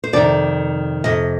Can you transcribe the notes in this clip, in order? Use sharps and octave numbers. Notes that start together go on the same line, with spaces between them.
C5
F2 C3 D#3 D5
F2 C3 D#5